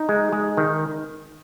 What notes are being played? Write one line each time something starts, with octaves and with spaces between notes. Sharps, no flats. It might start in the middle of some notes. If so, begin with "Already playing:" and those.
Already playing: D#4
G#3
G#3
D#3